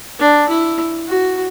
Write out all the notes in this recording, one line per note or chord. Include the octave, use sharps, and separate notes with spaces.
D4
E4
F#4